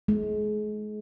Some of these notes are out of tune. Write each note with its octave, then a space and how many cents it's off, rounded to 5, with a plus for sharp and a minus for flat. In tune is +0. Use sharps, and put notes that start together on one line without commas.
G#3 +35